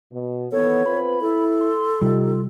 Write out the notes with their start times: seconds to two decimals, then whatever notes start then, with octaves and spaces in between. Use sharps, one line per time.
0.12 B2
0.52 D#3 E3 B3 A4 C#5
0.86 C4 F4 B4 B5
1.21 E4 A4
1.61 C6
2.01 C3 G3 D#4 F4 G4